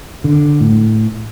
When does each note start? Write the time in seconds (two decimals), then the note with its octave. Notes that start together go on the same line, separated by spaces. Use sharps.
0.24 D3
0.61 A2